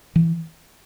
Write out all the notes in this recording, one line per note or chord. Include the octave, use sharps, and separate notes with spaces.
E3